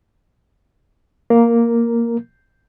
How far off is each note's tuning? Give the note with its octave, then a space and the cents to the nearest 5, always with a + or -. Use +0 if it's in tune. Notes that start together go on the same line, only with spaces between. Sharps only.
A#3 +0 A#4 +0